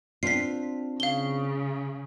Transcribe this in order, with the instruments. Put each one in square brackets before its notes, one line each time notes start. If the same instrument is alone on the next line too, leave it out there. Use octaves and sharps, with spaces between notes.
[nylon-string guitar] C4 D4 F4 [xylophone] B6 C7
[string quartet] C#3 [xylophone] F5 G7